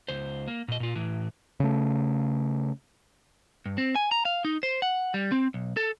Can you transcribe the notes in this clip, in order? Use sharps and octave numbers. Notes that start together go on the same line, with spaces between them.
C#2 C5
A#3
A#2 D#5
A#2 F4
A2 E3
C#3 A3
G2
C4
G#5
A#5
F5
D#4
C5
F#5
G3
C4
B1
A4